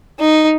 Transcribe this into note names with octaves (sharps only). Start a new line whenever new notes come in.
D#4